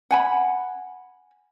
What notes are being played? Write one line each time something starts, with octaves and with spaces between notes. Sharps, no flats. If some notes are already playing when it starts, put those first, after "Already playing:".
F#5 G#5 B5